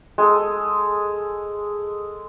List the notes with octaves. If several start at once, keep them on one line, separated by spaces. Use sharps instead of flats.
G#3 G#4 A4